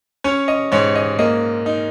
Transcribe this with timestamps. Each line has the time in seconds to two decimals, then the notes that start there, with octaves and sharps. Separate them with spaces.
0.24 C#4 C#5
0.48 D#5
0.72 G#2 C#5
0.95 D#5
1.19 A#3 D#5
1.66 D#4